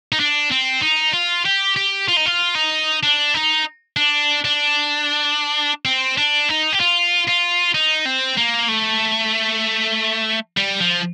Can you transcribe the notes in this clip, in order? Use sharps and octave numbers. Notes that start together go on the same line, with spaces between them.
D#4
D4
C4
D#4
F4
G4
G4
F4
D#4
F4
D#4
D4
D#4
D4
D4
C4
D4
D#4
G4
F4
F4
D#4
C4
A#3
A3
G3
F3